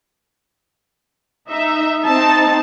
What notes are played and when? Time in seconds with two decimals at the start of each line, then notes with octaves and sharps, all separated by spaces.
1.47 D#4 E5
2.05 C4 D#4 A5